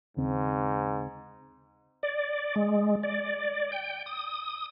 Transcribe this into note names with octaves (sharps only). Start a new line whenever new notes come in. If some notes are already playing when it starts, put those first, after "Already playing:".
D#2 G#2 C#3 C4
D5
G#3
D5
G5
D#6